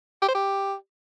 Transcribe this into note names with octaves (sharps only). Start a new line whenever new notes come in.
G4
C5
G4